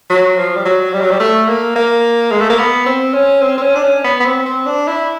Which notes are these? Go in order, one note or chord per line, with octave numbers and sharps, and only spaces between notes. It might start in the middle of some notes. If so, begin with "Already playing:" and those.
F#3
F3
G3
F#3
G3
F#3
G3
A3
A#3
A#3
G#3
A3
A#3
B3
C4
C#4
C4
C4
C#4
D4
C#4
B3
B3
C4
C4
D4
E4